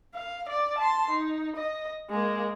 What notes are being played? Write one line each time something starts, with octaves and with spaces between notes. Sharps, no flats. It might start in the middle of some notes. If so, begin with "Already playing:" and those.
F5
D5
A5 C6
D#4
D#5
G#3 A#3